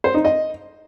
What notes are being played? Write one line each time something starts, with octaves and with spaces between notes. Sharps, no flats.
C5
D#4
D#5